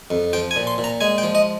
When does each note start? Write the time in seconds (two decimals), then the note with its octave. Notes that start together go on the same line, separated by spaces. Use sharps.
0.10 F2
0.33 F3 G5
0.51 G#5
0.56 A#2
0.67 C6
0.78 A#2
0.84 A#5
1.01 G#3 G#5
1.18 G5
1.23 F3
1.35 D#5